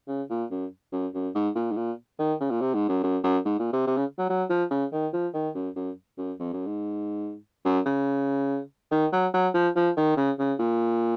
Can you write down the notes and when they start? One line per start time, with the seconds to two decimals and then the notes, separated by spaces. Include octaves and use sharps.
0.08 C#3
0.30 A#2
0.51 F#2
0.92 F#2
1.14 F#2
1.35 G#2
1.55 A#2
1.71 G#2
1.77 A#2
2.19 D#3
2.41 C#3
2.51 A#2
2.61 C3
2.74 G#2
2.89 F#2
3.04 F#2
3.24 F#2
3.45 G#2
3.59 A#2
3.73 C3
3.87 C3
3.97 C#3
4.19 F#3
4.30 F#3
4.50 F3
4.71 C#3
4.93 D#3
5.13 F3
5.34 D#3
5.55 F#2
5.76 F#2
6.18 F#2
6.40 F2
6.54 F#2
6.67 G#2
7.65 F#2
7.86 C#3
8.92 D#3
9.13 F#3
9.34 F#3
9.54 F3
9.76 F3
9.97 D#3
10.17 C#3
10.39 C#3
10.59 A#2